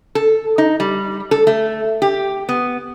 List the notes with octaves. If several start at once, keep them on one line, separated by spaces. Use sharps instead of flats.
A4
D#4
G3
A4
A3
G4
B3